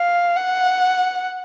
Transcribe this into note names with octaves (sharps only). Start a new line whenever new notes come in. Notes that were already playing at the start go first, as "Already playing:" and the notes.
Already playing: F5
F#5